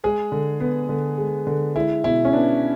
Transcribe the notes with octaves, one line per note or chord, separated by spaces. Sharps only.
G#3 G#4
D3
B3
D3
G#3
D3
G#3 E4
B2 E4
C#4
B3 D4